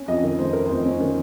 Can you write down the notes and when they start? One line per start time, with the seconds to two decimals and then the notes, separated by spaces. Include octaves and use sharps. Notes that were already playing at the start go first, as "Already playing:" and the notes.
Already playing: C#4
0.08 F2 D#5
0.23 D#3
0.39 A3 C5
0.53 A3 A#4
0.66 F2 C5
0.85 C#4
1.00 D#3